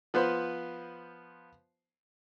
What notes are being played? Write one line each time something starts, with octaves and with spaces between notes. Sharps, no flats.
F3 B3 B4 C5